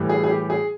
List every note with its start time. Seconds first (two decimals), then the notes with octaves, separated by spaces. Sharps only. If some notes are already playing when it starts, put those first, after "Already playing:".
Already playing: A2 E3 G3
0.09 G#4
0.24 G#4
0.29 G4
0.50 G#4